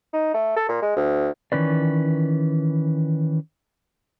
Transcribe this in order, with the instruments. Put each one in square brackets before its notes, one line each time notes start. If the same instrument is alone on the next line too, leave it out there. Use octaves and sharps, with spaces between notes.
[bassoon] D#4
A3
A4
A#2
G#3
D2
[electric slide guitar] D#3 E3 C#4 B4 D5